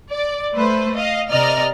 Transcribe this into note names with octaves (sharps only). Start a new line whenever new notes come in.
D5
A3 B4 C5
D#5 F5
C3 A#4 D5 D#5 F6